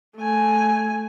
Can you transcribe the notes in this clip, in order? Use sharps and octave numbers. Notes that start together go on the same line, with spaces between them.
A3 G#5